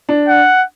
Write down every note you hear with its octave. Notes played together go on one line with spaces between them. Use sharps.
D4
F#5